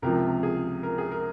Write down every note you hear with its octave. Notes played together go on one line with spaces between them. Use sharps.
C#2 C3 F3 A#4
G#4
A#4
G#4
A#4